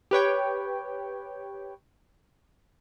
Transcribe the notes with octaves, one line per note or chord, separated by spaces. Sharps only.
G4 B4 C#5 G5